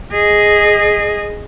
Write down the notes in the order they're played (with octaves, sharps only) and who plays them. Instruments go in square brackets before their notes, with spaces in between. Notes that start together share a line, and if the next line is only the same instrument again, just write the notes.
[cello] G#4 D#5